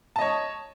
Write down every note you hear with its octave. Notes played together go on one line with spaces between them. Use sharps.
C#5 D#5 A5